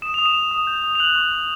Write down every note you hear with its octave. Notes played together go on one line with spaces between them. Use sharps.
D#6 E7
D#6 F7
E7
D#6
D#6
G6
D#6
F7
F#6 F#7
C#6
F#6